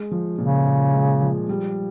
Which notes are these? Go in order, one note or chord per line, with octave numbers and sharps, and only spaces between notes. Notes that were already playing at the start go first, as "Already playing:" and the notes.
Already playing: G#3
F3
A#2 C#3
A#2
G#3
F3
G3